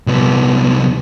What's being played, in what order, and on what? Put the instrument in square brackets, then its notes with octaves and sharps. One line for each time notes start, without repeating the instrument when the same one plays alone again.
[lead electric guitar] C2 B3